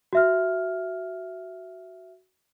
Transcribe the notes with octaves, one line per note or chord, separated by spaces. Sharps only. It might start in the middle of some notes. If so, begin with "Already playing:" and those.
F#4 E5 F6